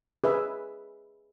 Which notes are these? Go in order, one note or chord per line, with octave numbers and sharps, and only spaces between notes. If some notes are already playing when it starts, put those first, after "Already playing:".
G#4 B4 E5